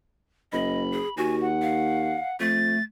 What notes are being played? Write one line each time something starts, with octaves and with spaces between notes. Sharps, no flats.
F#1 D#5 B5
G#4
D#2 F#4 G#5
F#5
F5
F2 A3 A6